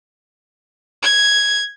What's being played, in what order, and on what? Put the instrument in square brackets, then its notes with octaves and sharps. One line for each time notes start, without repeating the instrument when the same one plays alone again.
[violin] G#6